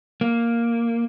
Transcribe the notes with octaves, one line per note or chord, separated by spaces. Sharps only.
A#3